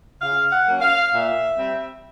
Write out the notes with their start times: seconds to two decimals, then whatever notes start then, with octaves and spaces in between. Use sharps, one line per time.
0.21 C#3 F5
0.51 F#5
0.66 F#3 A#3 C#4
0.81 F5
1.12 A#2 E5
1.57 G3 C4